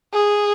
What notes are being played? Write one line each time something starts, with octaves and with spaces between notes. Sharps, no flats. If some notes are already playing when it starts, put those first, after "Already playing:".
G#4